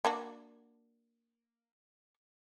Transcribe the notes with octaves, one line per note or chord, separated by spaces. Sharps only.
A#3 D4 F#4